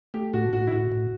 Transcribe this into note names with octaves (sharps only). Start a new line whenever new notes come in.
A3 G4
A2 F#4
A2 F#4
E4
A2 F#4
A2